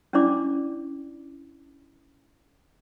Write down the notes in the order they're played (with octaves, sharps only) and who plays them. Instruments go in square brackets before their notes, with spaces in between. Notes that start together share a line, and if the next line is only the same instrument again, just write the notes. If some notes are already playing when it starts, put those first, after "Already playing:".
[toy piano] C#4 D4 E4 D5 D6